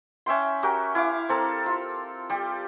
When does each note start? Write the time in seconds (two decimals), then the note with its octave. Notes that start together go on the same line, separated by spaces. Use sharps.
0.26 C#4 E5 G5 C6
0.63 F#4 G4 A#4
0.95 E4 F5 D6
1.29 C4 A4 A#4
1.66 F4
2.30 G3 G4